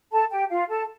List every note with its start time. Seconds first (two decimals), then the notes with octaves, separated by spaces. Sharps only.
0.12 A4 A5
0.31 G4 G5
0.50 F4 F5
0.69 A4 A5